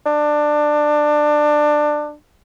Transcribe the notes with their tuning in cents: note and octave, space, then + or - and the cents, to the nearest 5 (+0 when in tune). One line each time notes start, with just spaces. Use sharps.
D4 +20